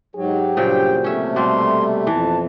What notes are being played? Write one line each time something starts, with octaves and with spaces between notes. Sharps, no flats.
G#2 F#3 G4
G2 A#2 C#3 F#3 C5 G5
C3 A3 C#4 E5
B2 G3 A#3 C4 C6
F2 E3 A5